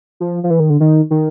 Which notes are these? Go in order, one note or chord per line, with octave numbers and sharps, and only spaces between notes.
F3
F3
E3
D#3
D3
D#3
D#3